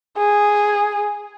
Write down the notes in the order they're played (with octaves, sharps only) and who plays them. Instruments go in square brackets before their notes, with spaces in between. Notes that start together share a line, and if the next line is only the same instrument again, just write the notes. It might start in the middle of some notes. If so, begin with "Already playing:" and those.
[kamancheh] G#4